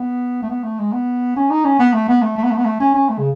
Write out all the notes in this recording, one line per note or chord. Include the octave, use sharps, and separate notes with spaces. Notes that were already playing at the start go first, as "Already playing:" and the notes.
Already playing: B3
A3
B3
A3
G#3
B3
C#4
D#4
C#4
B3
A3
B3
A3
A3
B3
A3
B3
A3
C#4
C#4
A3
C#3